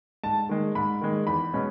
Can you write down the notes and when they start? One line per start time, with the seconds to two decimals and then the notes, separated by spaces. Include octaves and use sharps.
0.24 G#2 A5
0.49 D#3 G#3
0.75 G#2 B5
1.01 D#3 G#3
1.27 E2 B5
1.54 B2 G#3 C#4